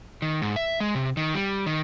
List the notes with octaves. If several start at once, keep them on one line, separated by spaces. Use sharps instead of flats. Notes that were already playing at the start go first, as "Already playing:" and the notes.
D#3
G#2
E5
G#3
C3
D#3
G3
D#3